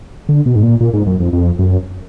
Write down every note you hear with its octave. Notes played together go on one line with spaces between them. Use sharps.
D3
B2
G#2
A#2
A#2
G#2
F#2
F2
F2
F#2